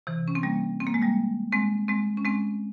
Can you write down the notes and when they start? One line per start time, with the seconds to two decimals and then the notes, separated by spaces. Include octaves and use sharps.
0.07 C3 E3
0.28 C#4
0.35 C4
0.43 G3 A#3
0.80 C4
0.87 A#3
0.94 G#3
1.02 G3 A#3
1.52 G#3 C4
1.88 G#3 C4
2.17 C#4
2.25 G#3 C4